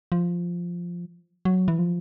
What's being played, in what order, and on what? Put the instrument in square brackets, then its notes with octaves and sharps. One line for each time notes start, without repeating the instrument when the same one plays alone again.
[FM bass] F3
F#3
E3
F3